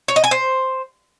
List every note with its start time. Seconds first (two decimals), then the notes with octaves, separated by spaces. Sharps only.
0.08 C#5
0.16 D#5
0.24 G#5
0.31 C5